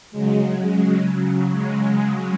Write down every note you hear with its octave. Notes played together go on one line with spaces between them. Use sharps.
C#3 F#3 G#3
G#3
G#3